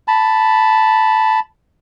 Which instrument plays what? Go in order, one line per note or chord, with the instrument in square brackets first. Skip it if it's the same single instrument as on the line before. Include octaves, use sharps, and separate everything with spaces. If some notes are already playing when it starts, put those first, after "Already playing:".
[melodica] A5 B5